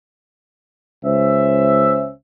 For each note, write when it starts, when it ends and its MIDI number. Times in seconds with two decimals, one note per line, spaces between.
1.04 2.11 37
1.04 2.11 61
1.04 2.11 72
1.04 2.11 76